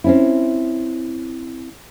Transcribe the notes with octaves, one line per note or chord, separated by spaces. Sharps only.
C4 C#4 E4